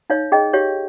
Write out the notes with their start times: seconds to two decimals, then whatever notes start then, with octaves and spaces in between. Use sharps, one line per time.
0.10 D#4 C#5 F5
0.32 G#4 D#5 G5
0.53 G4 C#5 F5